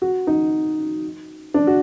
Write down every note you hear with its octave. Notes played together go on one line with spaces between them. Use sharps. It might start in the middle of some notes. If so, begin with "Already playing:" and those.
F#4
D#4
D4
F#4